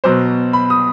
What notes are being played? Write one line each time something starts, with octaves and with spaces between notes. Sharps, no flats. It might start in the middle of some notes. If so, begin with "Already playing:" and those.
B2 F#3 C5
B5
D#6